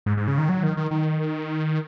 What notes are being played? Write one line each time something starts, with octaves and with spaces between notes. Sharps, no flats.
G#2
G#2
C#3
D#3
F#3
D#3
D#3
D#3